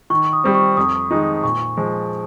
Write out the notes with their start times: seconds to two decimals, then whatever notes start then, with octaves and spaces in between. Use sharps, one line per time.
0.10 D#3 C#6
0.33 D#6
0.44 G3 C4
0.55 C#6
0.77 F2 D#6
1.10 D#3 G#3 D#4
1.43 A#2 C#6
1.77 F3 G#3